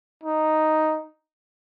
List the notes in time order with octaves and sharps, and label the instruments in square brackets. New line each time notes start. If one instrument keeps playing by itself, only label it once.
[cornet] D#4